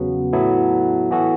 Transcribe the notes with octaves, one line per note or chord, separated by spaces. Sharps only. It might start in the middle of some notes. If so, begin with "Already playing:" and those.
Already playing: E2 C#3 F#3 B3 F#4
A2 F#3 B3 E4 A4
E3 B3 F#4 A4